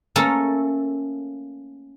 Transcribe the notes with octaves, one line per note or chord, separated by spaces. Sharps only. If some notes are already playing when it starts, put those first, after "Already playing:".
A3 A#3 C#4 A4